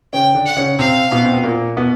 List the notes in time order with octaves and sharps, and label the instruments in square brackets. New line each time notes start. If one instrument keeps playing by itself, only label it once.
[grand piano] C#3 C#4 [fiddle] G5
[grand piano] D3 D4
[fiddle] F#5
[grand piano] C#3 C#4
[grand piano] C3 C4 [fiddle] F5
[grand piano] B2 B3
C4
B3
A#2 A#3
B2 B3